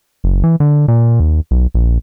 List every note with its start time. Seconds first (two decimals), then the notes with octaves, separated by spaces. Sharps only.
0.24 F#1
0.44 E3
0.60 D3
0.88 A#2
1.20 D#2
1.51 B1
1.74 A#1